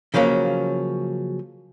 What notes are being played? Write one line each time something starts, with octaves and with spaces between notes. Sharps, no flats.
C#3 F3 F#3 A#3 C#4